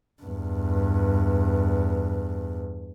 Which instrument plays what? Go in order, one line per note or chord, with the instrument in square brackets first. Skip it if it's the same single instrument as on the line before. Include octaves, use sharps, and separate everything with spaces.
[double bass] E2 G2